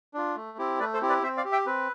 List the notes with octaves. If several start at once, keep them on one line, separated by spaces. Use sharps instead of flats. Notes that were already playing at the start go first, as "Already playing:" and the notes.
D4 F4
A3
C4 E4 G4
A3 B4 D5
A4 C5
C4 E4 G4
B4 D5
C4 C5 E5
D5 F5
G4
E5 G5
C4 B4